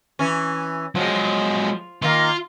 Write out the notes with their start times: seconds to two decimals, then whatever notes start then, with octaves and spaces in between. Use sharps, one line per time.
0.19 E3 C#4
0.95 F3 F#3 G#3
2.02 D#3 A#3 F4